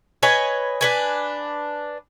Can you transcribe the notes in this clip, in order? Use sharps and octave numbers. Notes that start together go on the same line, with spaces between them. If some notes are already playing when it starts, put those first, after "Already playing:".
B4 C#5 D#5 G#5
D4 B4 G#5